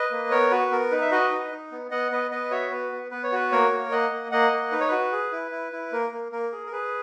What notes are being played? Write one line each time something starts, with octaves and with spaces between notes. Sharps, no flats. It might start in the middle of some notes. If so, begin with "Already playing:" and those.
Already playing: B4 D#5
A#3
B3 A#4 C#5
F#4 B4
B3 A#4
D#4 B4
E5
F#4 B4 D#5
D#4
D#4
B3
B3 D#5 F#5
B3 B4 D#5
B3 B4 D#5
F#4 C#5 E5
B3 B4
B3
B3 B4
C#5
F#4 B4
A#3 A#4 C#5
A#3
A#3 D#5 F#5
A#3
A#3 D#5 F#5
A#3
D#4 B4
C#5
F#4 B4
G#4
E4
E4
E4
A#3 A#4
A#3
A#3 A#4
G#4
A#4
G#4 B4